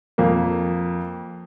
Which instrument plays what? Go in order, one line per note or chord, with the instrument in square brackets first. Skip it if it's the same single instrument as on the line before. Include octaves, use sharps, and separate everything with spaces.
[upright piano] F2 A#3